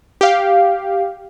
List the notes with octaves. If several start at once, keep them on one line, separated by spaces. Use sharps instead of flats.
G4 F5